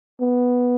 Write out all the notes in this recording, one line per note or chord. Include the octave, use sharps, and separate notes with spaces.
B3